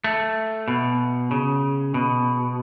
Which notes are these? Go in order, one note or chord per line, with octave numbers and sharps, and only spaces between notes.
A3
B2
C#3
B2